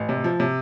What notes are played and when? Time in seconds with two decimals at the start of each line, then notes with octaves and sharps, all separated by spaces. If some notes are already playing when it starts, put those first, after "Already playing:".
Already playing: A1
0.09 C3
0.24 F3
0.40 C3